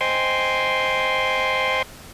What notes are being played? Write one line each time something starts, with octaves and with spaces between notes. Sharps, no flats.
C5 D#5 G5 G#5 C6